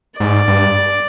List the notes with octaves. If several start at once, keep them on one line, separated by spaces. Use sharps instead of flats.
G#2 D5
G2